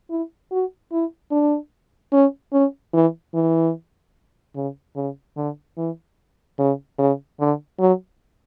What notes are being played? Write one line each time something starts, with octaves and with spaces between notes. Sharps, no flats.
E4
F#4
E4
D4
C#4
C#4
E3
E3
C#3
C#3
D3
E3
C#3
C#3
D3
F#3